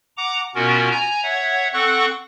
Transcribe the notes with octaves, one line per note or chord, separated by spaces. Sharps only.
F#5 A#5 D6
B2 B3 C#4 F4 F#4 A#4
G#5 A#5
C#5 E5 F#5
C4 A4 F#5 C#6 F#6